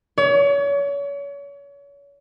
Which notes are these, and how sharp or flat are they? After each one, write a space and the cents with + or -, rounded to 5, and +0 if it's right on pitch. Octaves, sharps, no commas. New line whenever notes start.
C#5 +35